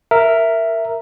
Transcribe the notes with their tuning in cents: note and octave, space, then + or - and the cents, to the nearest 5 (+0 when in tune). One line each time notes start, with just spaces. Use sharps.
A#4 -5 E5 +5